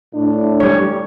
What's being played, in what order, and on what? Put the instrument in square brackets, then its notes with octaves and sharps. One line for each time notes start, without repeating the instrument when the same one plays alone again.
[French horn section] A2 D4
[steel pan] G3 C#5